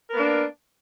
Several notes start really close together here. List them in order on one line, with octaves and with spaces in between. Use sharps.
A#4 B3 A#3 D4